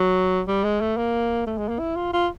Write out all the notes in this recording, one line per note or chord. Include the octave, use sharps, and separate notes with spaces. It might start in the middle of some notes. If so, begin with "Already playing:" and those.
Already playing: F#3
G3
G#3
A3
A#3
A3
G#3
A#3
E4
F4
F4